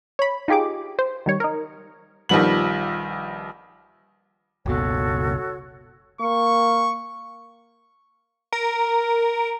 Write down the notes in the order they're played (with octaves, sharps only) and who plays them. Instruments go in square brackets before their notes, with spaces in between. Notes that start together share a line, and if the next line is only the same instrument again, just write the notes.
[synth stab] C#5 B5
D#4 F4 G4 G#4 D6
C5
D#3 G3 C#5
D#4 A#4
[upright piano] A#1 D#3 F3 G3 B3 F#7
[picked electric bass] F#1 C#2 B2 [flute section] F#4 A4 C#5
[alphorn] A#3 [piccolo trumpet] C#6
[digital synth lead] A#4